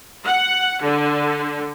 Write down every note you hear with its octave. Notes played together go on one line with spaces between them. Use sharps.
F#5
D3